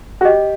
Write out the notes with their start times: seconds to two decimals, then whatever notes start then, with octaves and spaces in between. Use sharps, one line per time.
0.21 F#4
0.24 G4 D#5